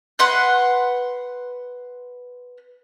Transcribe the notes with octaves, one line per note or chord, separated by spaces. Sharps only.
B4 F#5 C6 F#6